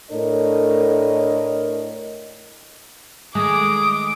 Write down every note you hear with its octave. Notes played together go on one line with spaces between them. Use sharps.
A2 D4 A4 A#4 C#5 D#5
D#3 G#3 A3 D6 D#6